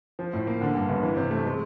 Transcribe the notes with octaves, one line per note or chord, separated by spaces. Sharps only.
F3
A2
A#3
D3
G2
G1
E3
C3
A3
G#3